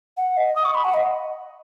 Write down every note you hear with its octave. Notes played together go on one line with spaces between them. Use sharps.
F#5
D#5
D#6
C#6
B5
F#5
D#5